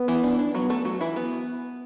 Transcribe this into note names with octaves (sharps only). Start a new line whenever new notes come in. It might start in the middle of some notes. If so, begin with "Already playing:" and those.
Already playing: B3
E3 E4
D4
D4
F#3 B3 F#4
A3 A4
F#3 F#4
E3 E4
B3